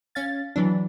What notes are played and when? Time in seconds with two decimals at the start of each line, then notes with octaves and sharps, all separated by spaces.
0.15 C#4 F5 A6
0.56 E3 F#3 D4